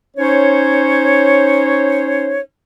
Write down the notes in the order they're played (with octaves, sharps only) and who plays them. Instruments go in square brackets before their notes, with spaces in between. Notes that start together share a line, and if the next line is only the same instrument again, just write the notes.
[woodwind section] C#4 D#4 C5 C#5